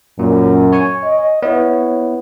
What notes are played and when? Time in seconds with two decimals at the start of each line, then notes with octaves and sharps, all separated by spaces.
0.19 F#2 A#2
0.73 C#5 G#5 C#6
1.03 D#5
1.43 B3 E4 C#5